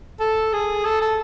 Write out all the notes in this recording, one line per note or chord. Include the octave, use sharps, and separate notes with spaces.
A4
G#4
A4
A4